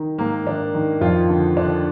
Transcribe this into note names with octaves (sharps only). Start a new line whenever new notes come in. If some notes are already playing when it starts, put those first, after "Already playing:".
Already playing: D#3
G#2 A#3
D#3 D4
D#3
F2 F4
D3
D3 D4